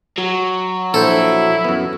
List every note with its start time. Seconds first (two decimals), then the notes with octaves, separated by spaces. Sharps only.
0.18 F#3
0.94 A#1 E4 A4 C5
1.65 F#2 B3